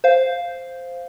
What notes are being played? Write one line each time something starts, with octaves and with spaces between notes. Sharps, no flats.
C5 F5